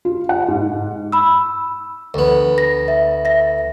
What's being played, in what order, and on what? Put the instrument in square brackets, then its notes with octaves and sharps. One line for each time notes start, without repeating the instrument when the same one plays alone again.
[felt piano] F4
F#5
G#2
[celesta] B5 E6
[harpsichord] D2 B3
[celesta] A#6
E5
E5 A#6